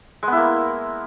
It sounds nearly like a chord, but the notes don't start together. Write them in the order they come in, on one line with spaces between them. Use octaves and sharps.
G#3 B3 E4 A#3